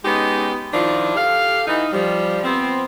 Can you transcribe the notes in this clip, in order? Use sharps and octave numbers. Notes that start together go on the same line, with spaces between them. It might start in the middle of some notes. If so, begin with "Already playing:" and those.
G#3 B3 C#4 D#4 G4
D#3 F3 D4 E4 F4
G4 A4 F5
E3 D#4
F3 G3
F3 B3 C4